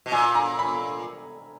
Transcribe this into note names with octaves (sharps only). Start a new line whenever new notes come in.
B2
A#2 G#5
A#5
B5